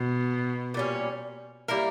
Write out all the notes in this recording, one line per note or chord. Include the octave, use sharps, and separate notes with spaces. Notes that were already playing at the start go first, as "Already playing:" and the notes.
Already playing: B2
A#2 G3 C#4
G3 A#3 E4 A#4